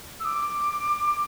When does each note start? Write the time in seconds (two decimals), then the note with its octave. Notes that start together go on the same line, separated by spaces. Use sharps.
0.20 E6
0.25 D6